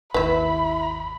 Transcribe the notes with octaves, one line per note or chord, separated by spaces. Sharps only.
G#1 D#2 E4 B4 E5 B5